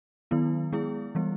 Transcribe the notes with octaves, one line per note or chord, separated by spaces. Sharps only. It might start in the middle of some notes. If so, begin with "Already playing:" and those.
D#3 F#3 B3 E4
G#3 B3 E4 G#4
E3 G3 B3